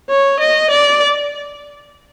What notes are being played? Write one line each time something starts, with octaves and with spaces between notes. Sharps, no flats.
C#5
D#5
D5